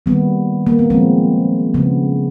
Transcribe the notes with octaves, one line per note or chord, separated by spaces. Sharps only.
D#3 G3 A#3 B3
A#3
B3
A#2 F3 G#3 C4
C#3 F3 A3 B3